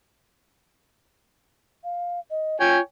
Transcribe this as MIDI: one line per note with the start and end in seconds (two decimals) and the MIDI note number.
1.84 2.20 77
2.30 2.59 75
2.60 2.81 65
2.60 2.78 73
2.60 2.78 79
2.60 2.78 80